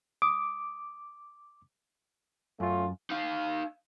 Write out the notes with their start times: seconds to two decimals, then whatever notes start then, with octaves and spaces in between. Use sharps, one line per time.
0.22 D6 D#6
2.60 F#2 A3 C#4 F4
3.10 D#4 F5